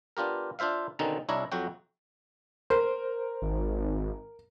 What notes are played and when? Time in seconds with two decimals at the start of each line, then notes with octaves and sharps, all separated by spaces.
0.17 B3 D4 F4 G4 A#4
0.59 D4 F4 C5 E5 F5
0.99 B2 D3 D#3 C4 C#4 D#4
1.29 C2 D4 E4 C#5 D#5 A#5
1.52 F2 F#3 F#4 G5
2.70 A#4 C5
3.42 G#1